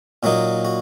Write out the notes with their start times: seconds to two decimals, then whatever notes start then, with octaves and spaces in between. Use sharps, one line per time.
0.23 A#2 F#3 A#3 D#4 F#4
0.65 F#4